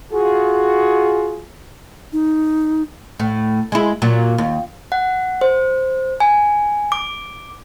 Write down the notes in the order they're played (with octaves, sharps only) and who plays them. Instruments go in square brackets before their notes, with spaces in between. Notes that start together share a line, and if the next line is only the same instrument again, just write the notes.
[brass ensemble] F4 F#4 G#4
[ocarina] D#4
[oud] A2
G#3 E4
A#2 F#3
D#2
[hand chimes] F#5
C5
G#5
D6